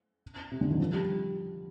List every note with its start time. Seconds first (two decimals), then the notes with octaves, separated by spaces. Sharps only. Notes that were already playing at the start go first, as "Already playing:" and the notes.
0.51 C3
0.61 D3
0.70 D#3
0.80 F3
0.93 G3